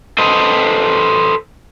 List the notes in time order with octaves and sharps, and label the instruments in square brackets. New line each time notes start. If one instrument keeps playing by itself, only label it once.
[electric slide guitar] A4 B4 C5 D#5